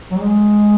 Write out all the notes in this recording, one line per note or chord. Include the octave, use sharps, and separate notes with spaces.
F#3
G#3